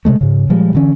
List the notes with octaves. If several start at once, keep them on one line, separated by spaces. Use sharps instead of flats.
C3 D#3 G#3 A3
G#2 C#3
A#2 F3 G3 G#3
D3 E3 C#4